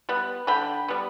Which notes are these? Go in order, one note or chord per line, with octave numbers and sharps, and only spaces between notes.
G3 B3
D3 G5 B5
G3 B3